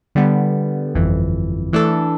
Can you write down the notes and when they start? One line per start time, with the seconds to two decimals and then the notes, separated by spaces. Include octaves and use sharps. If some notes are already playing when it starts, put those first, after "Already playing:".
0.15 D3 G3 B3
0.94 G1 F2 E3
1.73 E3 A3 D4 A4